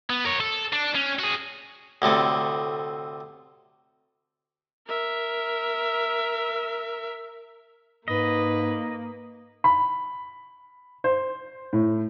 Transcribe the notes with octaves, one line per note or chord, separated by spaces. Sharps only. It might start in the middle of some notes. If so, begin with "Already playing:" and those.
B3
A#4 C#5
A4
D4
C#4
F#4 G#4
D2 A2 C3 A3
A#4 E5
G#2 A#3 B4 D#5
B5
C5
A2